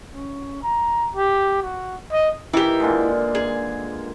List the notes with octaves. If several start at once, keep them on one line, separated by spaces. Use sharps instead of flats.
C#4
A#5
G4
F#4
D#5
D#3 E3 E4 G4
A#2 D3 G#3
G#4